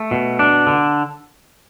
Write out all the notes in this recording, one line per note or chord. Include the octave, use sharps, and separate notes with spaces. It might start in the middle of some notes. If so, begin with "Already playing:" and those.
Already playing: A3
B2
D4
D3